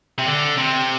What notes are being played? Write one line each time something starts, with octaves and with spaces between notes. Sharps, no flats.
C3
D3
C3